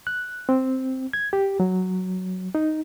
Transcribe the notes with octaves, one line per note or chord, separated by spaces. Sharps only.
F#6
C4
G#6
G4
F#3
D#4